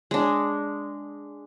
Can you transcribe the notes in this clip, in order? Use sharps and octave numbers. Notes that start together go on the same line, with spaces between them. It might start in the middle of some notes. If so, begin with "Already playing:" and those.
G#3 D4